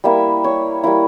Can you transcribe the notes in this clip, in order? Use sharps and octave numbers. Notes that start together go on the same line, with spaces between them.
G3 A#3 E4 E5
C#5
G3 A#3 E4